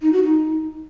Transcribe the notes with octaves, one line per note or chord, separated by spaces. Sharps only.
D#4
F#4
D#4